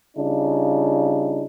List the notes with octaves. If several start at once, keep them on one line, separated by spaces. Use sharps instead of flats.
C#3 G3 D4 D#4 F4